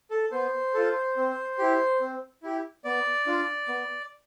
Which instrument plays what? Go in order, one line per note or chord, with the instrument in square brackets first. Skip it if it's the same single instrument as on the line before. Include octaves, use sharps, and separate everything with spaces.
[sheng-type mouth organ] A4
B3 C5
F4 A4
C4
E4 G4
C4
E4 G4
B3 D5
D4 F4
B3